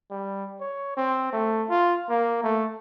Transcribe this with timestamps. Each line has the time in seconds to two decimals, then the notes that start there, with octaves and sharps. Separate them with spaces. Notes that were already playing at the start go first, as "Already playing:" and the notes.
0.10 G3
0.60 C#5
0.97 C4
1.33 A3
1.70 F4
2.09 A#3
2.43 A3